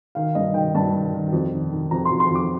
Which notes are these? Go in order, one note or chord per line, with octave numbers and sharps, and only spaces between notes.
D#3 F5
G2 D#5
D#3 G5
G2 A5
D#3
D#3
F2
D#3
D#3
F2 A#5
C6
F2
C6
F2 D6